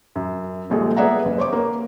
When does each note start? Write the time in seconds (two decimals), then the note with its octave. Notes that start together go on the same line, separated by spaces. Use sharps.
0.15 F#2
0.70 D#1 A#1 G#3 A4
0.97 B3 G#4 D5 E5 F#5 A#5
1.25 F#1
1.38 C5 C#5 D6
1.53 A#3